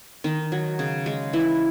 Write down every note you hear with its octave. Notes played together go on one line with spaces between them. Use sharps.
D#3 D#4
F#3
C#3
G#3
E3 E4